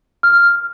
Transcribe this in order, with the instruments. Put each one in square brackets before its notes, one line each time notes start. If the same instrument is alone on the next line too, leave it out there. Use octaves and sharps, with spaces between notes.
[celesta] F6